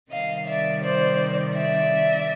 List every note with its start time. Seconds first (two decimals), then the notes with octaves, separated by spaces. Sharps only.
0.10 C3 D#3 G3 D#5 F5
0.47 D5 E5
0.83 C5 D5
1.56 D5 E5